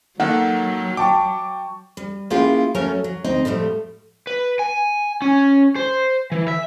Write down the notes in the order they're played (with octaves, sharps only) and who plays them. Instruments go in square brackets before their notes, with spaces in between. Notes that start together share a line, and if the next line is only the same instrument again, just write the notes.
[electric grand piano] D#3 A#3 A4 [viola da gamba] F#3 [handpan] F#5
[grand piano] G5 A5 C#6 [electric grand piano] D6
[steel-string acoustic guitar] G3
A#3 C#4 E4 F4 G#4 G5
F#3 A3 C#4 A4 A#4 C#5
F#3
D2 C4 D#4 D#5
A2 F3 G3 A3
[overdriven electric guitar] B4
G#5
C#4
C5
E3
E5